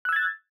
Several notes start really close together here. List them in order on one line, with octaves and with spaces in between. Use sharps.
F#6 E6 G#6 A6